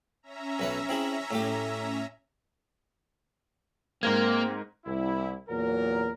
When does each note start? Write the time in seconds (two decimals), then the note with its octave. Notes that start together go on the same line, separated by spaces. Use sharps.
0.23 C#4 E5 A#5
0.60 B1 B4 C#5
0.89 C4 E4 G#4
1.31 A2 A3 G4
4.03 G#2 A#3 C4 A#4 G#6
4.85 C2 E4
5.49 E2 A#2 F#3 A#4